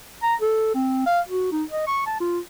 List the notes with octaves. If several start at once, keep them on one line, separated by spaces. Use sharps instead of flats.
A#5
A4
C4
F5
F#4
D#4
D#5
C#6
A5
F4